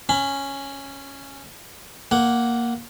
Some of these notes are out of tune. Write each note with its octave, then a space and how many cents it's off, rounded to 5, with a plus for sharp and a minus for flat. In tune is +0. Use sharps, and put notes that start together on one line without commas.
C#4 -5 B5 +30
A#3 +0 F#5 +5